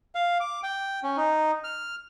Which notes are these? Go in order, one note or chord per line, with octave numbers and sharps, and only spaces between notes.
F5
D6
G5
C#4
D#4
F6